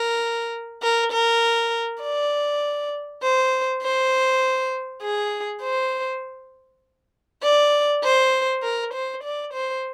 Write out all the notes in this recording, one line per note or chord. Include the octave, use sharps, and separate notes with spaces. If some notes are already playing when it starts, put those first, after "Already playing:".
Already playing: A#4
A#4
A#4
D5
C5
C5
G#4
C5
D5
C5
A#4
C5
D5
C5